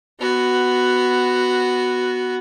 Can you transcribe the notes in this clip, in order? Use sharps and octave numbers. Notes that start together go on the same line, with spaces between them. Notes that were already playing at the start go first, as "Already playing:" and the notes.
B3 F#4